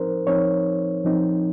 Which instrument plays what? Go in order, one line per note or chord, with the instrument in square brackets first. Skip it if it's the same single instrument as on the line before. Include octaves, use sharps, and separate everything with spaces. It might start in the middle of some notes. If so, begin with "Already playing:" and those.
Already playing: [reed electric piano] F3 C4 D#4 A#4 C5
F3 C4 D#4 C#5
F3 C4 D#4